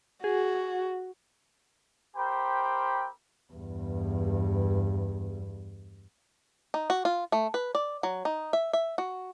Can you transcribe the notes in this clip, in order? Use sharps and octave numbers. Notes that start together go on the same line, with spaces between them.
F#4 G#4
C4 G4 A#4 C5 G5 B5
E2 G2
D#4
F#4
F4
A3
B4
D5
F#3
D#4
E5
E5
F#4